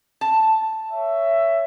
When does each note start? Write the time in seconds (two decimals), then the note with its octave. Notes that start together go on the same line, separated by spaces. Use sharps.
0.21 A5
0.91 C#5 E5